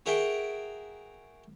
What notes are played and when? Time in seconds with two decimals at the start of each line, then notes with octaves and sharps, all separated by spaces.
0.06 F#4 G#4 A#4 E5 G5